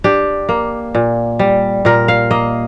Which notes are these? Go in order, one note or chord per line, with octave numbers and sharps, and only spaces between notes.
D4 G4
A#3
A#2
G3
A#2 A#4
F5
A#3 D#5